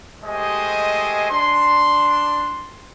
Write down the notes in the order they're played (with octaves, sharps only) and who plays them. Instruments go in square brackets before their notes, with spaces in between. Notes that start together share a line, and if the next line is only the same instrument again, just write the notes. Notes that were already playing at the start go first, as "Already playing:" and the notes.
[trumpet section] G#3 A3 G4 C5 D#5 G#5
D4 C6